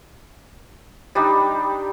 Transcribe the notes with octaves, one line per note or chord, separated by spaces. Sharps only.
G3 D4 D#4 G4